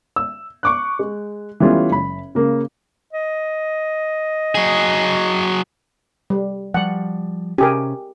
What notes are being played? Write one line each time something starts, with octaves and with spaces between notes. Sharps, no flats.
E6
C#6 D6 F#6
G#3
E3 G3 A3 B3 C#4 F4
F#1 B5
C#3 A#3
D#5
F#3 G#4
G3
F3 G3 F#5
C3 C#4 G4 G#4 A#4